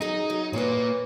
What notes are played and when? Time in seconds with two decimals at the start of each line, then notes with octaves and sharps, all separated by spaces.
0.01 F#3 D#4 G#4
0.30 F#3
0.53 A#2 A#3 B4 C#5